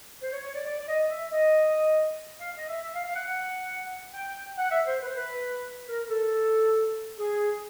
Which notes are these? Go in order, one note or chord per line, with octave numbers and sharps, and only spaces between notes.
C5
C#5
C#5
D5
D5
D5
D#5
E5
D#5
F5
D#5
E5
E5
F5
F5
F#5
F#5
G5
F#5
E5
C5
B4
C5
B4
A#4
A4
G#4